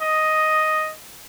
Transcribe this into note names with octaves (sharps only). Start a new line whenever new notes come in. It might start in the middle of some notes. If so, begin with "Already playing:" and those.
D#5